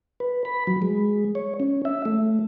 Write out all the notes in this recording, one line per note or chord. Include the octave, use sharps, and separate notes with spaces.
B4
B5
F#3
G#3
C#5
C#4
E5
A3